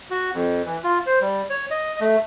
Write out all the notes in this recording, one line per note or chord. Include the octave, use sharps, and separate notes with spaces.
F#4
F2
E3
F4
C5
G3
C#5
D#5
A3